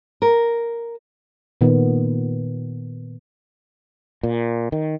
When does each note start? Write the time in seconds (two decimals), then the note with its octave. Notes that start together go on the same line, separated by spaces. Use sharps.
0.22 A#4
1.61 A#2 D#3 B3
4.23 A#2
4.72 D#3